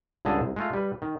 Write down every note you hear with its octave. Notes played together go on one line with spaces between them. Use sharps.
C#2 G2 D3 G#4 D#5 A5
C2
G#3 A3 F4
G3 B4
D#3